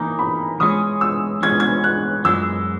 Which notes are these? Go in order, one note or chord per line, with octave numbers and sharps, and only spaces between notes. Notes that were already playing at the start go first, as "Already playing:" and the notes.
Already playing: E3 A#3 D#4 A#5
B5
E3 G#3 C#4 D#6
E6
E3 G#3 C#4 G#6
G#6
F#6
F#2 E3 G#3 E6